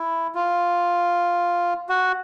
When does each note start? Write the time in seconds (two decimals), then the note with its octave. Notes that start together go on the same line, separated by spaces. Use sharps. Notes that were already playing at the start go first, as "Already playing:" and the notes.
Already playing: E4
0.35 F4
1.89 F#4